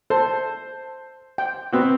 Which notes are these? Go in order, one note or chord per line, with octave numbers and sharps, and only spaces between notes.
A4 C5
G5
B3 C4 F#4